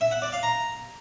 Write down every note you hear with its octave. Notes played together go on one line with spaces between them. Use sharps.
E5
F#5
D5
F5
A#5